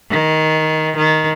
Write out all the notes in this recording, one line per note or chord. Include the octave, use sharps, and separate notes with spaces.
D#3
D#3